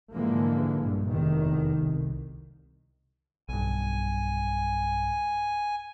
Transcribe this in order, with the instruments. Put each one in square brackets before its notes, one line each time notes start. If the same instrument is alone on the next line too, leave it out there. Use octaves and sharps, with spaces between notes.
[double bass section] G#2 D3 E3 F3 G#3 A#3
A#1 G2
F1 E2 C3 D#3
C2
[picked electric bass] B1 G2 [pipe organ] G#5